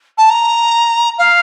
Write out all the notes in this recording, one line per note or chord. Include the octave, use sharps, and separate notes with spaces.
A5
A#5
F5